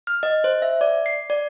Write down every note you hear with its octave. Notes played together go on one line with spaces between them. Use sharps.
F6
D#5
C5
E5
D5
C7
D5